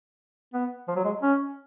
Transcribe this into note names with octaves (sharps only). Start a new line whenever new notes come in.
B3
F3
F#3
G#3
C#4